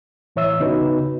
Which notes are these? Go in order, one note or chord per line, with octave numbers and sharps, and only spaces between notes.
A2 E3 C#5 E5 E6
C#3 B3 D#4 F#4 B4